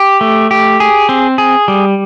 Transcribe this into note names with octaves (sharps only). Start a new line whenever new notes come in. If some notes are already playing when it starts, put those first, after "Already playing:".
Already playing: G4
A3
G4
G#4
C4
G#4
G3